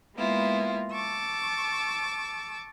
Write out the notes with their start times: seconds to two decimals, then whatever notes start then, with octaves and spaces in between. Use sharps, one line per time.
0.15 G#3 A#3 B3 E4 F4
0.93 A5 C#6 D6 E6